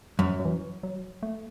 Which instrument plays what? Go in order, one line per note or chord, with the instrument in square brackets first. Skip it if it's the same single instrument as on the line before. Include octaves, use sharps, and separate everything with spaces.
[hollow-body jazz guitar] F#2
[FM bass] F#3
E3
F#3
A3